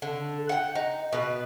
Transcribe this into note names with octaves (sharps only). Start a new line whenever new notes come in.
D3
F#5 G5
D#4
B2 B4